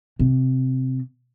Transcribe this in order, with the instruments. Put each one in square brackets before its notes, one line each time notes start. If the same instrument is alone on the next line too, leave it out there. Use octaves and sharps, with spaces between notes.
[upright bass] C3